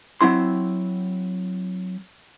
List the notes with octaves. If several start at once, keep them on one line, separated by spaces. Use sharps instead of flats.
F#3 C4 E4 C6